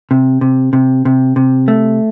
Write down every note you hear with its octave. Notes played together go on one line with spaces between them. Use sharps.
C3
C3
C3
C3
C3
A3